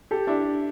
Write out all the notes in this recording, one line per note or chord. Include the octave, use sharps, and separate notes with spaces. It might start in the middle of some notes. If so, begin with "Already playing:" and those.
G4 A4
D4 E4